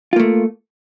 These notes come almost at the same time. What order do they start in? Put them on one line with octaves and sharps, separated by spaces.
F4 A#3 A3